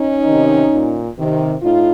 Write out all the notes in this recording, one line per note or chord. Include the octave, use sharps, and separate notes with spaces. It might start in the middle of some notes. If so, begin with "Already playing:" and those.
Already playing: C#4 D#4
C3 D#3
A#2
C3 D#3
A2 D#4 F4